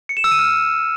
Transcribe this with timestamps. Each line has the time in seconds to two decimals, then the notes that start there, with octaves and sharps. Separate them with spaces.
0.09 C#7
0.17 E7
0.24 E6
0.32 D#7
0.39 F6